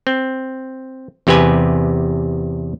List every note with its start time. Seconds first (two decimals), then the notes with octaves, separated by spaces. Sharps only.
0.07 C4
1.27 E2 C3 G4 B4 G#5